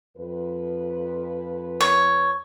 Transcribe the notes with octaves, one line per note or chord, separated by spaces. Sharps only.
F2 B4
C#5